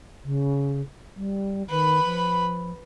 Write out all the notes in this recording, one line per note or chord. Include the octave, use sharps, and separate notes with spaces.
C#3
G3
D#3 B4 B5
F3